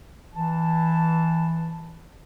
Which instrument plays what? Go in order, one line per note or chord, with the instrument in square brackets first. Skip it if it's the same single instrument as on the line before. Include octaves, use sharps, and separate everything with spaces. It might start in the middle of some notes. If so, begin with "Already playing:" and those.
[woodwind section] E3 A5